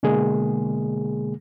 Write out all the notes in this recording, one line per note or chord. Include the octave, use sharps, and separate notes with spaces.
B2 D3 G#3 A#3 G#4